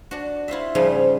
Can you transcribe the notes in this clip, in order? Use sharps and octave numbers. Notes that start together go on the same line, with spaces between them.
D4 F#4
E4 F4 C5 E5
G#2 C#3 F3 G3 G#4 G5